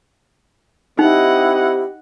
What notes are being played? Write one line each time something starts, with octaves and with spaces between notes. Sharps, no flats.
C4 D#4 E4 G4 D#5 F#5